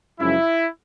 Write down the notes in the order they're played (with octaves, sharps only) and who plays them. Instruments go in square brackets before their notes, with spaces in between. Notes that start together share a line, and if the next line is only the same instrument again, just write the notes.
[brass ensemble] F#2 C#3 F3 G#3 C#4 E4